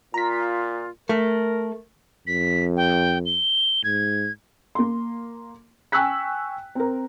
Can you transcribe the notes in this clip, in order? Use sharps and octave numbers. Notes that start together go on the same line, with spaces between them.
A#2 F4 A#5 B6
A3 A#4
F2 B6
G5
G7
G#2 G#6
A#3 C6
G5 G#5 C#6 E6 F#6 B6
C4 A#4